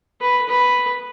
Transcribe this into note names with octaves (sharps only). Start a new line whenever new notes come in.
B4
B4